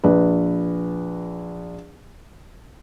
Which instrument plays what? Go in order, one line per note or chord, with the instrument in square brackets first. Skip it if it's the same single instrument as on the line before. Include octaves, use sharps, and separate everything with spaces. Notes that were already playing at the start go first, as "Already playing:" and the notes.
[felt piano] A#1 B4